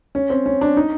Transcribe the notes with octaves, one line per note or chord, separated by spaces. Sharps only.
C#4
C4
C#4
D4
D#4